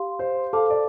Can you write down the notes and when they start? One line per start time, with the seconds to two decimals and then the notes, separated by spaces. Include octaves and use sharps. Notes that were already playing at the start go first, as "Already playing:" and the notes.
Already playing: G4 F5 C6
0.19 C5
0.53 A4 C5 F5 A5 D6
0.70 D5